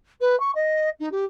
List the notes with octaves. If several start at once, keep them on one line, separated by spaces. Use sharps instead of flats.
B4
C#6
D#5
D#4
G4